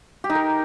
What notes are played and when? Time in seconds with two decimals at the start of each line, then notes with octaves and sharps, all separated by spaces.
0.24 G4
0.30 D#4
0.35 A#4